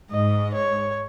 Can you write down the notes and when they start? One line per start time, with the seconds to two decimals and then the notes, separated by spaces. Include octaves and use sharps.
0.10 G#2 D#5
0.54 C#5